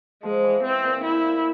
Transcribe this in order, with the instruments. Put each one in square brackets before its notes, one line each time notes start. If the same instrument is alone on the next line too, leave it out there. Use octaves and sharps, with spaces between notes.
[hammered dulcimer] F3 [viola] G#3
[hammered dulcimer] E3
[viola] C4
[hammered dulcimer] A#2
[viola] E4
[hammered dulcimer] A#2